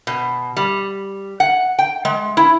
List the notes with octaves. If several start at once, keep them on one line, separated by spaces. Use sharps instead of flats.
B2
G3
F#5
G5
G#3
E4